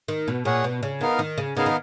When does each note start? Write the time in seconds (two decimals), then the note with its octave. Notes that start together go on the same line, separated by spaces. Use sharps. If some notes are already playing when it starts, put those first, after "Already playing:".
0.08 D#3
0.28 B2
0.45 A#2 G#4 C#5 F#5
0.64 B2
0.83 C#3
1.01 D#3 B3 D#4 A#4 F5
1.19 D#3
1.38 C#3
1.57 C#3 B3 D#4 A#4 F5
1.66 D#3